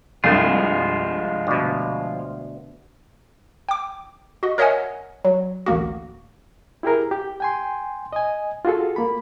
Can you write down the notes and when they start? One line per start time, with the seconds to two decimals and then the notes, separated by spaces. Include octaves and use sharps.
0.24 C2 G2 F3 G#3 A3 F4
1.47 D2 B2
3.69 G5 D6
4.43 F#4 D#5
4.58 A#4 C#5 D#5 E5 F#5 G#5
5.25 F#3
5.66 A1 D2 A#3 F#4
6.83 E4 G4 G#4 A#4
7.11 G4
7.40 G5 G#5 C6
8.13 D#5 G#5
8.65 F4 F#4 G#4 A4
8.96 A#3 B5